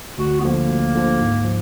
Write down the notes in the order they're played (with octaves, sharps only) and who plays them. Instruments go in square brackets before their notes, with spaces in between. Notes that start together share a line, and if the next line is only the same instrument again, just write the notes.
[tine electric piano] D2 [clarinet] F#4
[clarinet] B3
[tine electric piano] D3 F3 [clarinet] A#3
[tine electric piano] D2
D3 F3
G#2
F3